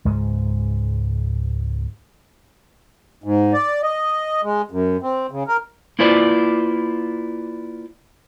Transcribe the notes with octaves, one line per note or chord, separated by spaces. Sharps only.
C#2 G#2 G#3
G#2
D5
D#5
G#3
F#2
C4
C#3
A#4
A#3 E4 F4 B4 C5 D5